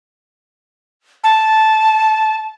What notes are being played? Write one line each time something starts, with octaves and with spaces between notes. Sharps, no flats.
A5